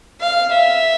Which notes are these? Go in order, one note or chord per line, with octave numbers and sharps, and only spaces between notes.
F5
E5